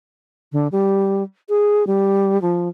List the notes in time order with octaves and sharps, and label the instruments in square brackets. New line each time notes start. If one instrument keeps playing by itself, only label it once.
[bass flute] D3
G3
G#4
G3
F3